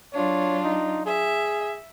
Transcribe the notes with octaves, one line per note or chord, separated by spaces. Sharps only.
F#3 D4 F4 C#5
D#4
G#4 E5